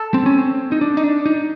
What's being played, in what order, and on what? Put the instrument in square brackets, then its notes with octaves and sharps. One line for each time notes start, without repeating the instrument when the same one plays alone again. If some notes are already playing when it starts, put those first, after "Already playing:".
Already playing: [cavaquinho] A4
[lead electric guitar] C4
C#4
C4
D#4
D4
D#4
D4
D#4